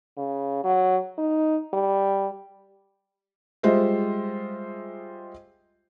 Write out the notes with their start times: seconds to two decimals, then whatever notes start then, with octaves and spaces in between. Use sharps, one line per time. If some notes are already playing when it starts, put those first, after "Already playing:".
0.18 C#3
0.64 F#3
1.18 D#4
1.74 G3
3.63 G3 G#3 F4 C5 D#5 E5